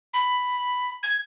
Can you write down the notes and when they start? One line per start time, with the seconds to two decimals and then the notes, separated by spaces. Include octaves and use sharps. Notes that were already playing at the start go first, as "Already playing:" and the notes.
0.13 B5
1.03 G#6